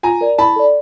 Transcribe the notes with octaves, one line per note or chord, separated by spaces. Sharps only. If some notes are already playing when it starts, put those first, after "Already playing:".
F4 G#5 A#5
A#4 D5
E4 A5 B5
A4 D5